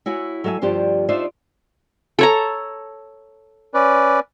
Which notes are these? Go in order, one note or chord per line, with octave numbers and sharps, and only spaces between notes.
E4 F#4 C#5 G#5
F#3 A4 E5 F5 G#5
D2 G2 F3 G4 C5 D5
D4 D#4 F4 C5 D5 E5
A4 C#5 A#5
C#4 B4 D5